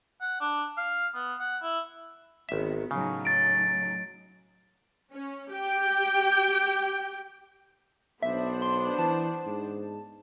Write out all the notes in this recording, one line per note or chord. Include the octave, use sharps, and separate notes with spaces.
F#5
D4
F5
B3
F#5
E4
G#1 D#3 B3 E5
A2 C#3 F#3 D#4
A6 D7
C#4
G4 G5
B1 B3 D4 C5 E5
C6
E3 A5
G#2